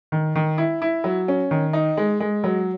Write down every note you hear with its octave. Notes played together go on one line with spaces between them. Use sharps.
D#3
D#3
E4
E4
F#3
C#4
D#3
D#4
G#3
G#3
F#3